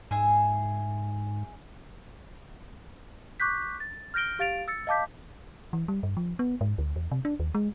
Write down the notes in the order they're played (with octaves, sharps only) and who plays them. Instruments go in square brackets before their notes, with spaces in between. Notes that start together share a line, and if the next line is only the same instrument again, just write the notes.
[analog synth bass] G#2 [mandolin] G#4 E5 G#5
[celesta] C#6 D6 F#6 G6 B6
A6
F6 G6 A#6 D7 G7
G4 F5 A6 D7 F7
E6 A6 C#7
D#5 F5 A5 D6 G6 B6
[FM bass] E3
G3
G2
F3
B3
G#2
D2
E2
C3
D4
D#2
G#3